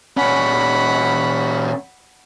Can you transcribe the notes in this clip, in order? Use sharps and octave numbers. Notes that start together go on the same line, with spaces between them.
A#2 C#4 F#5 B5